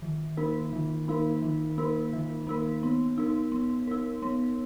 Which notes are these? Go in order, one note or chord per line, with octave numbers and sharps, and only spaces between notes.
D#3
A#3 D#4 A#4
D#3
A#3 D#4 A#4
D#3
A#3 D#4 A#4
D#3
A#3 D#4 A#4
B3
D#4 A#4
B3
D#4 A#4
B3